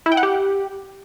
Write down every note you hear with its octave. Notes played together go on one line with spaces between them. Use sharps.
E4
G5
F#5
G4